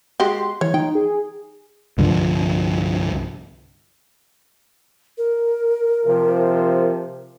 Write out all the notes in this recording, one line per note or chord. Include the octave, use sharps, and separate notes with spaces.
G#3 F#4 G4 C6
E3 C#5
D#4 G5
G#4
C2 G2 D3 F3
A#4
C3 F3